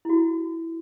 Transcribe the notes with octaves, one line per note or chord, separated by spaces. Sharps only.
E4 F#4